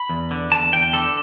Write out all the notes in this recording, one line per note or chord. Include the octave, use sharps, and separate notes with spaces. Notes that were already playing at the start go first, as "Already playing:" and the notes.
Already playing: B5
E2
D3
E2 A5
E2 G5
D3 A4